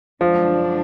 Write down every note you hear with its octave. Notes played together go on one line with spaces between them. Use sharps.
F#2 D3 F3 G#3 D4